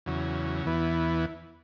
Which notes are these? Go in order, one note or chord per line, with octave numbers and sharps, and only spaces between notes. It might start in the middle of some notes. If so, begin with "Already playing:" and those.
E2 C#3 F#3
E2 E3 B3